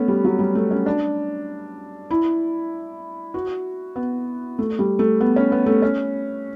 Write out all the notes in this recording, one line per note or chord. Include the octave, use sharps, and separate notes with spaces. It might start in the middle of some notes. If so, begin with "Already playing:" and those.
Already playing: A3 B3 C#4
G3
F#3
G3
A3
C#4
D4
E4
F#4
B3
A3
G3
A3
B3
C#4
B3
A3
C#4